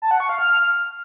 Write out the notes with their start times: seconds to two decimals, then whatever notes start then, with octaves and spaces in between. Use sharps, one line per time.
0.02 A5
0.11 F#5
0.20 C#6
0.29 F5
0.38 F6